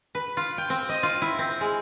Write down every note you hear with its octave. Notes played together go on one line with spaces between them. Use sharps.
B4
F4
G5
C4
D#5
F4
E4
C4
G#3